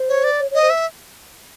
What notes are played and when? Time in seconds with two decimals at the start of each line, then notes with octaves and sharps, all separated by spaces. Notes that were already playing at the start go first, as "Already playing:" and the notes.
Already playing: C5
0.09 C#5
0.24 D5
0.40 C#5
0.51 C#5 D#5
0.62 C5
0.70 E5